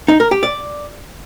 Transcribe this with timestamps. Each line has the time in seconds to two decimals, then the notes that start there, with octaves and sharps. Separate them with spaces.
0.08 D#4
0.20 A#4
0.31 G4
0.43 D5